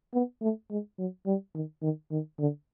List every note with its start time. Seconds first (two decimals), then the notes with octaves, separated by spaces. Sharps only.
0.14 B3
0.42 A3
0.70 G#3
0.99 F#3
1.26 G3
1.54 D#3
1.82 D#3
2.11 D#3
2.39 D3